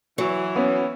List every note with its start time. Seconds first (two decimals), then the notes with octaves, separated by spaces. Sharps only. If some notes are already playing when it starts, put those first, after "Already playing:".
0.18 E3 F#3
0.56 B3 C#4